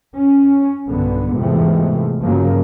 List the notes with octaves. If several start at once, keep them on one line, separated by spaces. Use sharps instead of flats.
C#4
B1 G2 D3 B3
E2 G#2 C3 E3 F3 A3
G2 C#3 F3 F#3 A#3